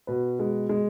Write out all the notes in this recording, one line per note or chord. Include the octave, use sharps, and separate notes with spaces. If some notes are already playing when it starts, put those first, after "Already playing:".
B2 B4
G#3
G#3